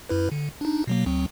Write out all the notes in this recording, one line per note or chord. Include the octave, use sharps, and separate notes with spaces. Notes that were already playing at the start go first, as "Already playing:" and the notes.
F#2 E4 B4
D3
D4 D#4
B2 F#3 A#3
D2 F#3 C4